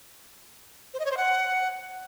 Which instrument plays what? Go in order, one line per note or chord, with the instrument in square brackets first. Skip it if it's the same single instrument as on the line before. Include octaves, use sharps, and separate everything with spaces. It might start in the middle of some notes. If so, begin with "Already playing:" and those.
[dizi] C5
D#5
C#5
C5
F#5